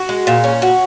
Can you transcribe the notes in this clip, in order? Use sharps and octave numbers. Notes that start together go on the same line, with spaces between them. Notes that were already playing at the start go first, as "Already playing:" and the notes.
Already playing: F#4
G#3
A#2
C#4
F#4